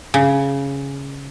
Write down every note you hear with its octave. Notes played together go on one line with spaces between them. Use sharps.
C#3